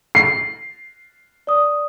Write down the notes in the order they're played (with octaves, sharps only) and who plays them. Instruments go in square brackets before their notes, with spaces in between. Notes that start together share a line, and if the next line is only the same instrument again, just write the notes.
[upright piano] C7
[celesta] D5 D#6